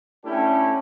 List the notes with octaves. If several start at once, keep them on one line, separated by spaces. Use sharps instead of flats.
A3 C#4 D4 E4 G4 A4